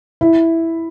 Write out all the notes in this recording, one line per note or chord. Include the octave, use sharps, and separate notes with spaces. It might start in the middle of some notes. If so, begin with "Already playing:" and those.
E4